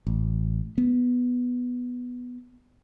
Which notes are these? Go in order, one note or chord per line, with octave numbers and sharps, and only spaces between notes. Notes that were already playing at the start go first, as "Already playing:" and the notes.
A1
B3